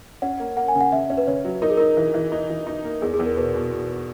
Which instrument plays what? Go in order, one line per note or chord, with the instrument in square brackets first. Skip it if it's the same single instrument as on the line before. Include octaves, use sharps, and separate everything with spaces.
[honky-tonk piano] C#4 [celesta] F#5
[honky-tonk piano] A#3
[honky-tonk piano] A#3 [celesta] F#5
[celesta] G#5
[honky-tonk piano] C#3
[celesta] F#5
[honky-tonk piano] C#3 [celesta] E5
[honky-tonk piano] C#4
[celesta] B4
[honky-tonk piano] C#3 [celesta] C#5
[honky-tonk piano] F#3
[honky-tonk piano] D#4 [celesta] A#4
[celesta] G#4
[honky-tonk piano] D#4 [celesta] A#4
[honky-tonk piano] E3
E3
D#4
E3
D#4
A#3
[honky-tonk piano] E2 [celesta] G#4
[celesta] G#4
[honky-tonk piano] E2
[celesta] A#4
[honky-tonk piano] B2 [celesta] B4
[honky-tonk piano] B2
B2